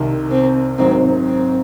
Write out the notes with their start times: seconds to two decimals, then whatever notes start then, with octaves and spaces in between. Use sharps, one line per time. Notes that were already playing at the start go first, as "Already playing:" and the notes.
Already playing: C2 C3 D#3
0.31 C4
0.78 G#1 G#2 D#3 F#3 C4
1.26 C4